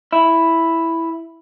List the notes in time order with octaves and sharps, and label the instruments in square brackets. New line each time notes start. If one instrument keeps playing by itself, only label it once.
[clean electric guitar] E4